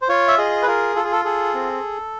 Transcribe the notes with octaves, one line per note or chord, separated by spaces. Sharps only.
C5
F4 C#5
E5
G#4 D#5
B4
F4 A#4
F4 A4
G#4
A4
G#4 A4
C4